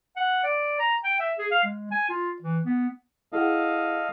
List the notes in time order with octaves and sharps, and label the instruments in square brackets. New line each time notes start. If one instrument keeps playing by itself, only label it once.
[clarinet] F#5
D5
A#5
G5
E5
G#4
F5
G#3
G#5
F4
E3
B3
[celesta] E4 G#4 F#5 [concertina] A4 D#5 F5